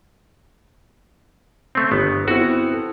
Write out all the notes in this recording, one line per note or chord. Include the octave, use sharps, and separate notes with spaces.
A3 C4
G1 B3
B3 C4 E4 F#4
A4